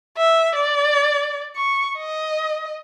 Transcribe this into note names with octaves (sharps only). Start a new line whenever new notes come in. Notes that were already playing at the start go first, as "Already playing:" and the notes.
E5
D5
C#6
D#5